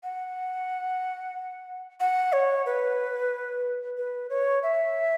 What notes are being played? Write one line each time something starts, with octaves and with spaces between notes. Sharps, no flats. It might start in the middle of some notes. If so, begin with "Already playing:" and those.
F#5
F#5
C#5
B4
B4
C#5
E5